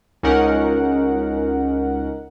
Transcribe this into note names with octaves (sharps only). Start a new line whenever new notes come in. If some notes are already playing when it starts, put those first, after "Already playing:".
C#2 C#4 D#4 A#4 F#5